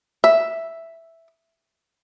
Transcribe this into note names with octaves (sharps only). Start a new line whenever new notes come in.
E5